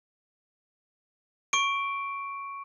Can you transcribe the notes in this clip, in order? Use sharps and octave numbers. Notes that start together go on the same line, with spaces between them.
C#6 D7